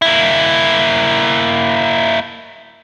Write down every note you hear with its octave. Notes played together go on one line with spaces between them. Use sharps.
A#3 E4